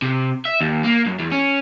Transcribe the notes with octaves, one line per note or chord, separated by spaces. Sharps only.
C3
E5
D#2
A#3
F#2
E2
C#4